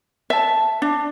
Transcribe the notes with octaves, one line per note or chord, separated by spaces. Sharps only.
E5 A5
D4